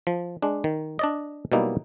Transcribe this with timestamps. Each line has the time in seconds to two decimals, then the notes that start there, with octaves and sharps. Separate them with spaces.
0.07 F3
0.42 G#3 D4
0.64 D#3
0.99 D4 D5 D#5
1.52 B2 F#3 G3 A#3 D#4 E4